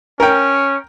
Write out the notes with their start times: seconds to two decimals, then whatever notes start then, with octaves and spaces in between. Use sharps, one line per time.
0.20 C#4 A#4 G5